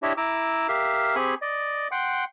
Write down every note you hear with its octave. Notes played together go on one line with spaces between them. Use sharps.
D4 E4 G4 C#5 D#5 E5
E4 A#5 D6 E6
G4 A#4 E5 F5
C4 G4 G#4 G#5 B5 C#6
D5 D#5
F#5 G5 C6